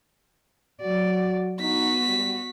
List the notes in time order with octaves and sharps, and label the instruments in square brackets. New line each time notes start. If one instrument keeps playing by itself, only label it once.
[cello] F#3 D5 [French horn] F#4
[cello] B3 F#4 [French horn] D#4 [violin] B6
[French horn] G3